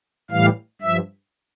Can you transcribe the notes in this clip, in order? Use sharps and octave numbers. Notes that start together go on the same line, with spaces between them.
A2 E3 G3 F5
G2 F3 E5